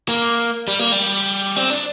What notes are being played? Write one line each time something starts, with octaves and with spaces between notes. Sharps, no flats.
A#3
G3
A#3
G3
C4
D4